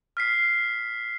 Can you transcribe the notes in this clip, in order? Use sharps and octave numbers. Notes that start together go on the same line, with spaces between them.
F6 B6 C7